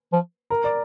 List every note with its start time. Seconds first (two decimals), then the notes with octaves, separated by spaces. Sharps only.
0.13 F3
0.50 A#4
0.64 D5